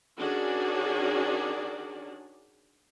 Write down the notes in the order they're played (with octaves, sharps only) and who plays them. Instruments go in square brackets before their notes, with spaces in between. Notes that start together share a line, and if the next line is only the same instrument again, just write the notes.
[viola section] D#3 C#4 D4 F#4 G#4 D5